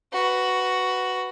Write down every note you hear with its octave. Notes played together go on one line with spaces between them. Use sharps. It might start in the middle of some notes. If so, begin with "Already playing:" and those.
F#4 B4